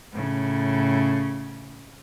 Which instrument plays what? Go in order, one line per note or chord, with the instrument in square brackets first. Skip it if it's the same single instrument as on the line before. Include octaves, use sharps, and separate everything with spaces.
[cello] A2 C#3